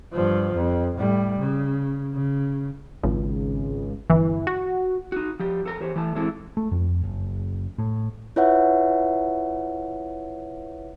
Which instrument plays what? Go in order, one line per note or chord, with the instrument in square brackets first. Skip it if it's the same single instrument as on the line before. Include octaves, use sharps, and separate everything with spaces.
[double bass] G2 F3
F2
A2 G3
C#3
C#3
[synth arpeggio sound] G#1 C#2
G1 E3
F#4
[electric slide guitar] D#4 F#4
F3 G4
F2 A4 A#4
E2 G4 C5 C#5
E3 A3 A5
A2 E3 G#3 C4 E4 A4
[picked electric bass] A3
F2
F#1
A2
[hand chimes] E4 F4 B4 C#5 E5 F#5